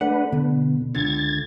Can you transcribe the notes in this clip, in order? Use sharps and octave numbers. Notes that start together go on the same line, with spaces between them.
A3 D4 B4 F#5
B2 D3
C#2 D3 G#6 A6